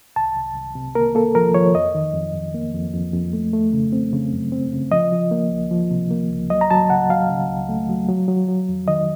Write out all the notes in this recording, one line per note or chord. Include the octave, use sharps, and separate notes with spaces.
C2 A5
C2
C2
C3
A#3 A#4
A#3 A4
F3 A#4
F3 C#5
F2 D#5
D#3
F2
F2
A#3
F2
F2
F2
A3
A3
C#3
C4
C#3
F#2
C4
C#3
F3 D#5
F3
A#3
C#2
F3
C3
A#3
C#2
F#3 D#5
A#5
F#3 A5
C#3 F#5
F#3 F5
C#3
C#2
A3
F#3
F#3
F#3
F#3
F2
D#3 D#5